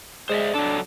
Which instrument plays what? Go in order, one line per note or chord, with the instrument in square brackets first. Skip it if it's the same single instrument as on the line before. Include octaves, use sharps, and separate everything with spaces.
[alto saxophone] G#3 [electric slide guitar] C5 D5 E5
[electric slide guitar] F#3 A4 [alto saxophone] D4